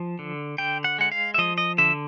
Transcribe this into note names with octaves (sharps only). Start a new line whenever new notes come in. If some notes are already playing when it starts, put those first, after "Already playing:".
Already playing: F3
D3
D3 G5
F#5
G#3 F#5
F5
E5
F3 D#5
D#5
D3 E5